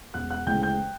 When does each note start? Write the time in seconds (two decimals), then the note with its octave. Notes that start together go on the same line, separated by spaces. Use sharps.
0.14 E1 F#5 F#6
0.30 F#5 F#6
0.46 D2 C#3 E3 G#3 G5 G6
0.62 G5 G6